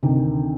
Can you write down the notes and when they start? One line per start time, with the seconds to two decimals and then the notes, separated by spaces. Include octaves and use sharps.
0.03 D2 C3 D#3